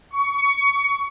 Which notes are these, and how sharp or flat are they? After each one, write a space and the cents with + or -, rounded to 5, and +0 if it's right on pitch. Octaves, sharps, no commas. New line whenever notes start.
C#6 +25